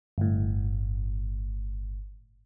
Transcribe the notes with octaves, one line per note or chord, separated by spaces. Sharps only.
G1 A2